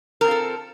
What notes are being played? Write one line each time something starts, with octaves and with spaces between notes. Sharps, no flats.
C4 F4 A4 A#4